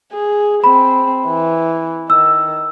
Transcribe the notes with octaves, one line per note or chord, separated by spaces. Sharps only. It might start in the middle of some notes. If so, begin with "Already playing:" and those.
G#4
C4 B5
E3
D#3 E6